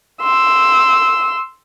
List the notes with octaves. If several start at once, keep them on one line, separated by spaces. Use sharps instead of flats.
C6 E6